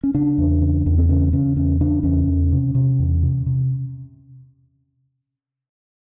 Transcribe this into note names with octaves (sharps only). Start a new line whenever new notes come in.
C#4
C#3 D4
E2
C#3
E2
C4
C#3 C#4
C#3 C#4
E2 C#4
C#3 D4
E2 C#4
E2
C3
C3
E2
C3
C3